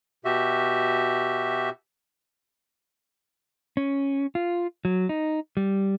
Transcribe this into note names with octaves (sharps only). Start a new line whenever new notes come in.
B2 F#4 G4 E5
C#4
F4
F#3
D#4
G3